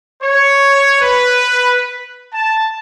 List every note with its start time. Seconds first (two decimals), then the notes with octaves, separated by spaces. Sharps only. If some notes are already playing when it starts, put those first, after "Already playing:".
0.23 C#5
1.01 B4
2.34 A5